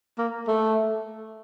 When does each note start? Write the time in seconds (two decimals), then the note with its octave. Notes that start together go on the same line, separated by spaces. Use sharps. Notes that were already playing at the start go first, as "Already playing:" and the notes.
0.18 A#3
0.48 A3